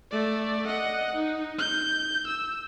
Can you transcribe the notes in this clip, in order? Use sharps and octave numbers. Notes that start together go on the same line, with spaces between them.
A3 D5
D#5 F#5
D#4
G6
E6